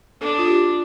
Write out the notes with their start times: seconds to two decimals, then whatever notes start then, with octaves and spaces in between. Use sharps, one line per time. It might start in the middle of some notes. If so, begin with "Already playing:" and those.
0.21 D4 A4
0.39 F4
0.47 G4